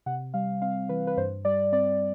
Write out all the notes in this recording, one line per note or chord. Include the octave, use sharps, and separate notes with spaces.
C3 F#5
G3 F5
C4 F5
E3 B4
B4
G2 C5
G3 D5
C4 D5